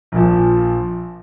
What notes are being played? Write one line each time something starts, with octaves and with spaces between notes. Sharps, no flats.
A#1 A#2 F3